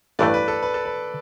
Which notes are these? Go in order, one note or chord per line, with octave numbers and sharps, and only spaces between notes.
A1 G2 E3 A3 B4 D5
B4
A4
B4
A4
B4